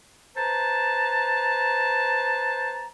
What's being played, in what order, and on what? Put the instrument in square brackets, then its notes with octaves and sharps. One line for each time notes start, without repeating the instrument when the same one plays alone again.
[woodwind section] B4 C5 A5 A#5